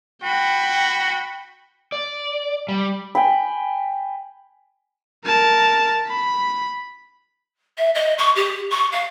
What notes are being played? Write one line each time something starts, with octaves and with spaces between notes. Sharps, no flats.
F#4 G5 B5
D5
G3
G5 G#5 B5
A#4 A5
B5
E5
D#5
C#6
G4
C#6
F5